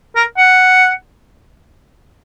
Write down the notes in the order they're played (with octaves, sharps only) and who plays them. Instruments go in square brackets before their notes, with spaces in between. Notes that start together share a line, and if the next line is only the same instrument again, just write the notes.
[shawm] A#4
F#5